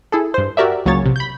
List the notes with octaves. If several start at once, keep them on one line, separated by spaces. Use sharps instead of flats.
E4 G#4 A4
G2 C5
F#4 G4 A#4 D5 E5
C#2 F#3 A#3 G#4 C#5 A6
A#1 C3
B5 G6